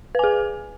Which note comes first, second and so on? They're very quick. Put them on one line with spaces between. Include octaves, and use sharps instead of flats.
B4 G#5 G#4